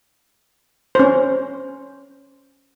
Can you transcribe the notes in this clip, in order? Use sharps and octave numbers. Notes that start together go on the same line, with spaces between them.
C#4 C5